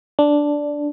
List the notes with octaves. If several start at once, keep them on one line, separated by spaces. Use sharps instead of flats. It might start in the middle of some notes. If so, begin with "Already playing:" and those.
D4